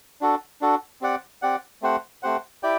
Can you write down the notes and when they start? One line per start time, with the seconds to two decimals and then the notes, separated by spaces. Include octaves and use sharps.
0.21 D4 F#4 A4
0.61 D4 F#4 A4
1.01 C4 G4 D5 F#5
1.42 C4 G4 D5 F#5
1.82 A3 C4 G4 C5 F#5
2.23 A3 C4 G4 C5 F#5
2.63 E4 G4 D5 G5